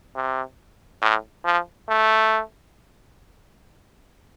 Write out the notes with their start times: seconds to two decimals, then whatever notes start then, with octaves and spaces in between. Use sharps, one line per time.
0.16 C3
1.02 A2
1.45 F3
1.89 A3